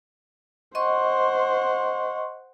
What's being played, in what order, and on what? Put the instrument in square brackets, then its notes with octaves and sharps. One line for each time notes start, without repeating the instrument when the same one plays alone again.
[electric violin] C5 F#5 [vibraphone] D#5 C6 C#6